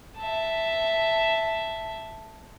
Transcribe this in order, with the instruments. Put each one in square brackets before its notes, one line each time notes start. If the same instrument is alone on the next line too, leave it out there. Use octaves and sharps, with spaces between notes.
[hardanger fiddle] E5 A5